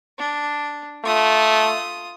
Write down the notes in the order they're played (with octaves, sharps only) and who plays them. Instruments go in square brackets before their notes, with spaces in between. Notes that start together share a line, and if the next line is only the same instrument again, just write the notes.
[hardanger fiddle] D4
[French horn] A3 [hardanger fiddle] F4 D#6